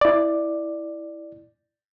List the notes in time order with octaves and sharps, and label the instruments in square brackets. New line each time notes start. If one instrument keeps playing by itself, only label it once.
[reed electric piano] E4 D5